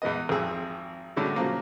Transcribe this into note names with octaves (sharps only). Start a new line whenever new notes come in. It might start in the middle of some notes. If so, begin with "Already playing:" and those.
E2 E3 G#3 B3 D#5
G#1 F2 G#4 E6
A2 D3 G#3 C#4 E4 F#4
C#3 F3 F#3 A#3